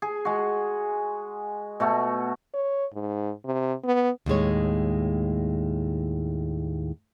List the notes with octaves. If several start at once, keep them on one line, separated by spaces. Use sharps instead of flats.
G#4
G#3 F#4
B2 A3 F#4
C#5
G#2
C3
B3
D#2 A2 G#3 C#5